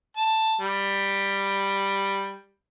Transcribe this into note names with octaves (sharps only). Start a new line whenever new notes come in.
A5
G3